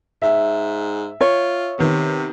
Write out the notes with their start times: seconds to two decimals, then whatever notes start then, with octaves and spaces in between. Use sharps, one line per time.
0.22 G#2 E5
1.21 F4 C#5
1.79 C3 D#3 B3